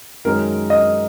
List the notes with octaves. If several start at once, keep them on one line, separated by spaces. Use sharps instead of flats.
F#2 D#3 G#3 C#4 A#4
D#5